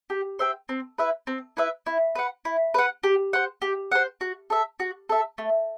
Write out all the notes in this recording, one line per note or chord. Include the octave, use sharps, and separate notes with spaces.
G4
C5 E5 G5
C4
E4 B4 E5
C4
E4 B4 E5
E4
B4 F#5
E4
B4 F#5
G4
C5 F#5
G4
C5 F#5
F#4
A4 E5
F#4
A4 E5
A3